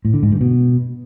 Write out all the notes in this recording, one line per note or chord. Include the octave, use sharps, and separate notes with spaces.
A2
D3
G#2
G2
B2